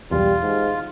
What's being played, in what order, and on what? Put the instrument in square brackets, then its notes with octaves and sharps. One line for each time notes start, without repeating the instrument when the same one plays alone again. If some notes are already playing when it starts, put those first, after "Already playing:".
[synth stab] B1 E2 [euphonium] G3 [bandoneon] F4
[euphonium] G#2